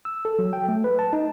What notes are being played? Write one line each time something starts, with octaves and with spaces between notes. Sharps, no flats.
E6
A4
F#3
G5
A3
B4
A5
D#4